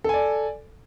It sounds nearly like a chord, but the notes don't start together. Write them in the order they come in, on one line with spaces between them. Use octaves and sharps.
A4 G#5 D5